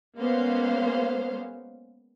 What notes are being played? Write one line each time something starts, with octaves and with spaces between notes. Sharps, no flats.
G#3 A#3 B3 C#4 C5 F5